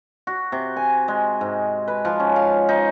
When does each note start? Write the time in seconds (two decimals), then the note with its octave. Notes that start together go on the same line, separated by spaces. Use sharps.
0.27 F#4
0.52 C3
0.76 G#5
1.08 G#3
1.41 G#2
1.88 B4
2.05 F3
2.20 C#4
2.36 F5
2.69 D#4